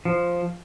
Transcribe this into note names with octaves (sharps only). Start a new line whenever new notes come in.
F3